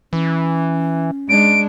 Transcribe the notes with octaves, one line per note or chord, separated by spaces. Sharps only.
E3 C#4
G#3 D4 D7